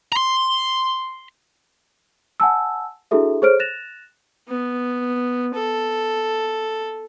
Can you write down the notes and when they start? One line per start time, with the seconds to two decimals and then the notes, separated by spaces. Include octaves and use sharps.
0.12 A#5 C6
2.40 F#5 G#5 A5 E6
3.11 D4 E4 F#4 G#4 A4 E5
3.42 G#4 A4 C5 C#5 F6 D7
3.59 F#6 A6 A#6 E7 F7
4.48 B3
5.54 A4